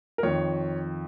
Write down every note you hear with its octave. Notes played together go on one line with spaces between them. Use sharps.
A#4
F2 D#3 C#5